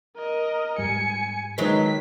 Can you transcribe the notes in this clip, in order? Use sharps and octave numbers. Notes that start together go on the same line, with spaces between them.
A#4 D#5
G#2 G3 G#5 C#7
D#3 F#3 G#3 D#4 B4 B6